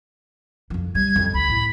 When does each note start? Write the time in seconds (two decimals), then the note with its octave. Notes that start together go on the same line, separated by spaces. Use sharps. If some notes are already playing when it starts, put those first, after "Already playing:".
0.70 F2 F3
0.95 G3 G#6
1.16 F2
1.34 D2 B5
1.50 A2